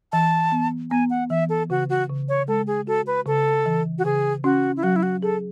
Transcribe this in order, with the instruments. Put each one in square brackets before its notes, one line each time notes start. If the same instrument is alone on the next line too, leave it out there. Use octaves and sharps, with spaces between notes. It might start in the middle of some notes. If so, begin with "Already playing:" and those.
[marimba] E3 [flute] A5
[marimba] B3
[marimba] B3 [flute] G#5
[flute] F#5
[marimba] E3 [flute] E5
[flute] A4
[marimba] C#3 [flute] F#4
[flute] F#4
[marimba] C#3
[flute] C#5
[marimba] G#3 [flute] A4
[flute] G#4
[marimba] F#4 [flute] A4
[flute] B4
[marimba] C#3 [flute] A4
[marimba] E3
[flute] F#4
[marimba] C#3 [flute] G#4
[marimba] C#4 [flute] F#4
[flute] E4
[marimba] F#3 [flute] F#4
[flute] E4
F#4
[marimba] G#4 [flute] A4